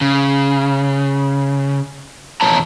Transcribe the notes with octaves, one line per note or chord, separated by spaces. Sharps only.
C#3
E2 B2 F3 C#5 A5 A#5